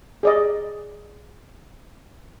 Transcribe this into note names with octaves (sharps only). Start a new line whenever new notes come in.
G#4 D5 D#5